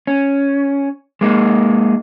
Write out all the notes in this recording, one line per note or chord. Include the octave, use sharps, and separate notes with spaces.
C#4
G#3 A#3 D#4